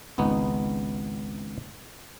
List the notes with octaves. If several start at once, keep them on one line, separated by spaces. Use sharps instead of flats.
G#1 C#2 B3 D#4